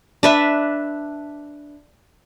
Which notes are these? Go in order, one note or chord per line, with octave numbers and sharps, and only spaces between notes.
D4 B4 E5